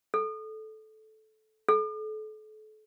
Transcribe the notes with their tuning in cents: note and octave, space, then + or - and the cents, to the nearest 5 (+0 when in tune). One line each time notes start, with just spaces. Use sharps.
A4 -15
A4 -35